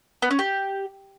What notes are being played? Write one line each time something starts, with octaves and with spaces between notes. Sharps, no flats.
B3
C#4
G4